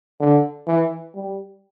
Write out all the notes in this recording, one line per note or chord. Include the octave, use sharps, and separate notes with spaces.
D3
E3
G3